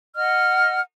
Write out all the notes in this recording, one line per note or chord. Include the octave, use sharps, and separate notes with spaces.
D#5 F#5 F6